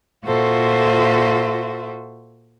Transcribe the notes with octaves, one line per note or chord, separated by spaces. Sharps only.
A#2 F4 F#4 A4 C5 E5